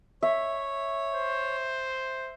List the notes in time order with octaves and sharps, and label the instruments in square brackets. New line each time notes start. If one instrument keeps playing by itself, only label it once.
[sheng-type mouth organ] C#5 [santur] E5
[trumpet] C5